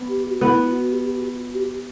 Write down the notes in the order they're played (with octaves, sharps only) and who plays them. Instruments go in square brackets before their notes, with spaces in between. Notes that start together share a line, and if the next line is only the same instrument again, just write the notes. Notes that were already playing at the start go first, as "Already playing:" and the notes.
Already playing: [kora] B3
[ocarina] G4
F#4
[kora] B3 [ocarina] E4
[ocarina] E4
F#4
G4
G4
F#4
F#4
F#4
G4